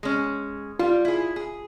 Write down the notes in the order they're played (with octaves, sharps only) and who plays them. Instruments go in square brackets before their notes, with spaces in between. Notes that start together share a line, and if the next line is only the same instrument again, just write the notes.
[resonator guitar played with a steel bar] G#3 C#4
[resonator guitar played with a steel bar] G3 [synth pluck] F4
[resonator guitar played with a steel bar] E4 G#4
G#4